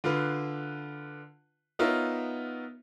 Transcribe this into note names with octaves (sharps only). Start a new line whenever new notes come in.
D3 F4 B4
B3 D#4 F4 A#4 C#5 E5